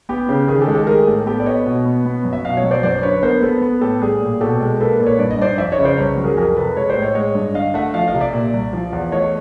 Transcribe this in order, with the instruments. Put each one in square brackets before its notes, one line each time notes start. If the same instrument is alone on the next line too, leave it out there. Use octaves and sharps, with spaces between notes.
[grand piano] B3 G4
C#3
D#3 G#4
G4 A4
G#3
G4 A4
A3 G#4 A#4
A2 G4 A4
B3 G4 A4
D5
B3 C#5 D#5
B2
B3
B3
F#2
E5
B2 D#5 F5
C#5 D#5
F#3
C5 D5
F#2 C5 D5
D3 B4 C#5
B3 A#4 C5
B3 A4 B4
B3
A2 G4 A4
G3 G#4
A#2
B2 G4 A4
G#3
A#3 A4 B4
A#2
B4 C#5
G2 D5
D#5
G2 C5 D5
F2 D5 E5
C#5 D#5
C#3
C5 D5
C2 B4 C#5
F#3
G#4 A#4
F2 G#4 A#4
C3 A4 B4
G#3 B4 C#5
C5 D5
A2
C#5 D#5
G#3 C#5 D#5
G2
D3 D#5 F5
A3 E5 F#5
F3 D#5 F5
D#5 F5
C3
D5 E5
A#2
C2
F3
E2
A3 C#5 D#5